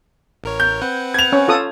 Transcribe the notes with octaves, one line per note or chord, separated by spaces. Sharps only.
A1 A#4 C#5
G6
C4 B4 F#5
G#6 F7
C#4 C#5
F4 A4 D#6